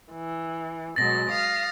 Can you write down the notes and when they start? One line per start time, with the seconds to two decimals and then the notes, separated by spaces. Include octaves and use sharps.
0.13 E3
0.96 B2 F#3 G#3 A6 A#6
1.30 F5 D#6 F6